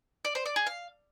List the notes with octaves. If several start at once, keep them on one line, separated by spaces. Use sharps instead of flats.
D5
C5
D5
G#4
F5